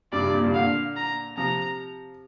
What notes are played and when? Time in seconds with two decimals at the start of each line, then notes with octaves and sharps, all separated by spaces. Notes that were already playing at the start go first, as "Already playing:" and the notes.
0.12 G2 C3 D5
0.23 G2
0.34 A#2
0.44 G2 C3
0.54 A#2 D3 F5
0.97 A#5
1.37 C3 F3 A#5